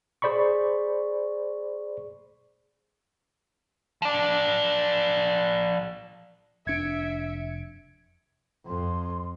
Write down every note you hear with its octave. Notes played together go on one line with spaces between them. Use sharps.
G#4 C5 D5 B5 C#6
F3 D5
F1 D4 E5 G#6 C#7 D7
F2 C6